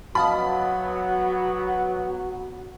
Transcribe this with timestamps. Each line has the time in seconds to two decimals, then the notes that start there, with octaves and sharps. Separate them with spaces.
0.15 F#3 B3 F#4 D#5 F5 A5 B5